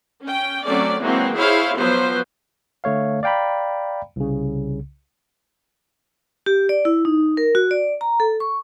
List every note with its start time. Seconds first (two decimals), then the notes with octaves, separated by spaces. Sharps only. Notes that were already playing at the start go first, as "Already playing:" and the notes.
0.23 C#4 G5
0.64 F#3 A3 C4 C#4 D5
1.02 E3 F#3 G#3 A#3 C4
1.37 E4 G#4 C5 C#5 F5
1.79 F3 F#3 B3 B4 C5
2.84 D3 A3 C#5 F5
3.23 D5 F5 G5 A#5 B5
4.16 C2 C#3
6.46 G4
6.69 D5
6.85 E4
7.05 D#4
7.37 A#4
7.55 F#4
7.71 D5
8.01 A#5
8.20 A4
8.40 C#6